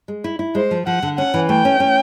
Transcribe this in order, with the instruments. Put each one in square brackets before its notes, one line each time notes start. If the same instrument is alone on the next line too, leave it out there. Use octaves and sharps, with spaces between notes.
[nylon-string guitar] G#3
E4
E4
[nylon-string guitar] G#3 [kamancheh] C5
[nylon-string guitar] F3
[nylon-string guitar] F3 [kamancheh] F#5
[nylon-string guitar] D3
[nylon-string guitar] C#4 [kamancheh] F#5
[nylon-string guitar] E3
[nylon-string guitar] A3 [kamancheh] G5
[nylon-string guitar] C#4
C#4